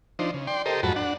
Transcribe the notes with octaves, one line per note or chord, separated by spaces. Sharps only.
F3 D4 D#4 C5
C#3
D5 G5 C6
G4 A4 A#4 C5 D#5
F2 G#2 F#3 F#4 A5 B5
D4 F#5